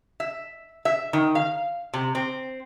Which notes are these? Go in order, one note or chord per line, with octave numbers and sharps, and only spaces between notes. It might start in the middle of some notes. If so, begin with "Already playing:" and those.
E5
E5
D#3
F5
C3
C4